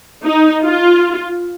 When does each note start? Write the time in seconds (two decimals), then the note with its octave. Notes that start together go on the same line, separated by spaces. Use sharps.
0.24 D#4
0.64 F4